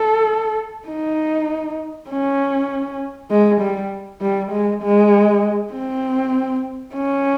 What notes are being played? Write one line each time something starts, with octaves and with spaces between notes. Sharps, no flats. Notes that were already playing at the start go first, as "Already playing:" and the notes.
Already playing: A4
D#4
C#4
G#3
G3
G3
G#3
G#3
C4
C#4